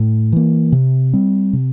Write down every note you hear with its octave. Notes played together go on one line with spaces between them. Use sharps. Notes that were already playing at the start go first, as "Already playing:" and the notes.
Already playing: A2
E3 A#3
C3
G3 C4
C3